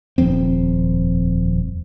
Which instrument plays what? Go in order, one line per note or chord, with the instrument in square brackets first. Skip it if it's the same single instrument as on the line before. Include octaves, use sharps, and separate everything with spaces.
[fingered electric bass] D#1 F2 C4